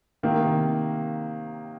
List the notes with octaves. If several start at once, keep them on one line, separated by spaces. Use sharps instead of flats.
C3 D#3 A#3